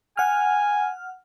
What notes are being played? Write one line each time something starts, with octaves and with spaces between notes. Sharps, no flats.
F#5 G#5 F6